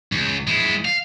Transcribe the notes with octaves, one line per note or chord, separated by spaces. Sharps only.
C#2
G#3 E4
F5